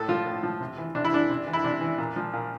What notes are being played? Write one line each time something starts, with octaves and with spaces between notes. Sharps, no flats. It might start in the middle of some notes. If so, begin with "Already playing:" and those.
Already playing: A2 A4
F3 F4
A2
F3
C3
E3
C3 D4
E4
E3 D4
C3
E3
E4
C3 D4
E3
A#2
F3
A#2